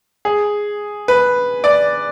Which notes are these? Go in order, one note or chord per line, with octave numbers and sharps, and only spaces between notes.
G#4
B4
D5